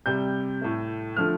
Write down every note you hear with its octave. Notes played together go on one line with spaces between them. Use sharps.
C3 G3 G6
A2 A3
D3 F3 A3 F6